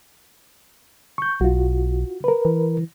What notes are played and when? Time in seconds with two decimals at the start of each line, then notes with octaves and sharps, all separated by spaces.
1.18 C#6 G6
1.41 B1 F4 F#4
2.24 A#4 B4
2.45 E3